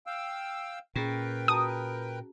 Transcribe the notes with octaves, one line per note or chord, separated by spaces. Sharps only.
F5 G5 E6
A#2 C#4 G#4 A#4 B4 G5
F#4 A5 A#5 D#6